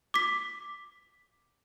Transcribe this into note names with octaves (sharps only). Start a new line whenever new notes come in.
D6 B6